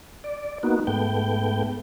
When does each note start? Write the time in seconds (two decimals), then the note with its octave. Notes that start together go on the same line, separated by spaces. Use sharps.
0.24 D5
0.63 A#3 B3 D#4 F#4
0.87 G#2 A3 B3 G5